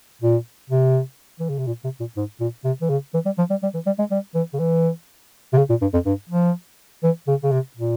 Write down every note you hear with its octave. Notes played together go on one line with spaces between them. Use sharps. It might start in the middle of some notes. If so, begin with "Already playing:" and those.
A#2
C3
E3
C#3
C3
A#2
C3
A#2
G#2
A#2
C3
E3
C#3
E3
G3
F3
G3
G3
E3
G3
G#3
G3
E3
C#3
E3
C3
C#3
A#2
G2
F2
G2
F3
E3
C#3
C#3
C3
A#2